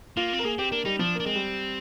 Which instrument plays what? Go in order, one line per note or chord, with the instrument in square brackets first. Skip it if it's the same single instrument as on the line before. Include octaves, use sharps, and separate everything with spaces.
[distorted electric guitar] A#3 [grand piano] F4
[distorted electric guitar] C4
[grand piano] A#4
[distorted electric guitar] A#3 [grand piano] G#4
[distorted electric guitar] C4 [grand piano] G4
[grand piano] A#3 [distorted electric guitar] D4
[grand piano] G3 [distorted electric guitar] D#4
[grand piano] F3 [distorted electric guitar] D4
[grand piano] A#3 [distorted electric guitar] D4
[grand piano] G#3 [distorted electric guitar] C4
[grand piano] G3